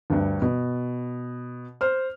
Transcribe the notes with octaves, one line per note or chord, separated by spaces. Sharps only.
D2 G2
B2
C5 F6